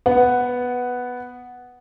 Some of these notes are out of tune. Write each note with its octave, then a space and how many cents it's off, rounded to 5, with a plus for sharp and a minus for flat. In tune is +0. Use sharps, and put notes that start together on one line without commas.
B3 +0 F#5 +0